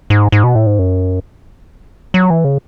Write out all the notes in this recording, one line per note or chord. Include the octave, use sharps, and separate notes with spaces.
G#2
G#2
B2
A2
G#2
F#2
F#3
E3
C#3